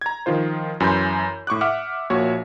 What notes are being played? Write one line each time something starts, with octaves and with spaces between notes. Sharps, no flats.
A#5 G#6
D#3 F3 F4 C5
F#2 E3 G#5 B5 C6 G6
A2 C#6 D6 F#6
E5 F#5 D6 F6
A#1 A#2 F#4 C#5